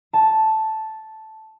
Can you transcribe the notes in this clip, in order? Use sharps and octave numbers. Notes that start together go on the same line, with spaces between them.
A5